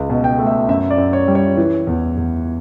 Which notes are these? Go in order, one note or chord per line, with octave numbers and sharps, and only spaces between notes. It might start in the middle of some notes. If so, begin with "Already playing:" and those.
Already playing: C#2
B2
G5
A3
E5
F#2 E5
D5
F#2
C#5
G3
C#5
E3
E2
E2